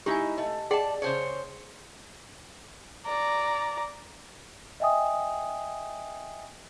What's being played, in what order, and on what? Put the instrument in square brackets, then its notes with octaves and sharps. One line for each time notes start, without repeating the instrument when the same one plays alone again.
[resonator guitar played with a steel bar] G#3 D#4 E4 [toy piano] G4 G#5
[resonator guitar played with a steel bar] A3 [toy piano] D#5
[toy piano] G#4 F#5 G5 [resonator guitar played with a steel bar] D5 A5
[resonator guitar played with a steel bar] C#3 C5 C#5
[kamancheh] D5 A#5
[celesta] D#5 E5 G5 G#5 D#6